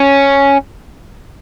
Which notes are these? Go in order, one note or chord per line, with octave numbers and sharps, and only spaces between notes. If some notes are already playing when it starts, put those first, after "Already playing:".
Already playing: C#4